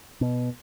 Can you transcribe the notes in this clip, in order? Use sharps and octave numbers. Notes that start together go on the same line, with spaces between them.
B2